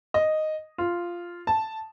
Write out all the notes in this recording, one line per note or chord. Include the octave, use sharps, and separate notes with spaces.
D#5
F4
A5